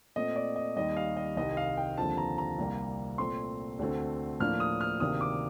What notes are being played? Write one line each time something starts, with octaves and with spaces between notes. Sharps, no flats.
A#2 A3 C4 D#5
D5
D#5
D#2 D#3 G3 D#5
F5
D#5
C2 C3 D#3 D#5
F5
G5
D#2 D3 F3 C4 A5
A#5
A#5
C2 C3 G3 A#3
A#2 A3 C4 C6
D2 D3 A3 C4
A2 F3 A#3 D4 F6
D#6
F6
D2 C3 D#3 A#3 D4 D#6
D6